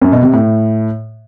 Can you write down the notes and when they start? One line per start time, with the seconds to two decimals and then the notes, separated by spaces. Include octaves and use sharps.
0.02 F#2
0.12 B2
0.23 C3
0.33 A2